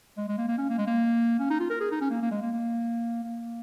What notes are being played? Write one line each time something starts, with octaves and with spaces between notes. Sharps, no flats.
G#3
G#3
A#3
A#3
C#4
A#3
G#3
A#3
C#4
D#4
F4
A#4
G#4
D#4
C#4
A#3
A#3
G#3
A#3
A#3
A#3